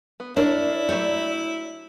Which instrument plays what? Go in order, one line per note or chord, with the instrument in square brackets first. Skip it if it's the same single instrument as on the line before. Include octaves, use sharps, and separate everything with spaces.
[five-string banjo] B3
[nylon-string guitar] D4 [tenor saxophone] E4 [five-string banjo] A#4 C#5 [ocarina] D5
[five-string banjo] F#3 A3 G4 [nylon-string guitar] C#5